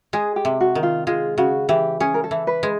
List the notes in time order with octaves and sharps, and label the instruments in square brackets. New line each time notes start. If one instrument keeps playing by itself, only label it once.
[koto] G#3 [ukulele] G#4
[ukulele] G4
[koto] C3
[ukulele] F#4
[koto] D#3
[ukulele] F4
[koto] G#3 [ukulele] F4
[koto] C#3 [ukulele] F#4
[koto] E3 [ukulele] G4
[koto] C#4 [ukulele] G#4
[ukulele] A#4
A4
[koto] E3
[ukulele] B4
[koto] G#3